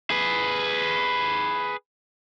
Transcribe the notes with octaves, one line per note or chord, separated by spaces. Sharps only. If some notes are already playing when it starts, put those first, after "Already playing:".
G#4 B4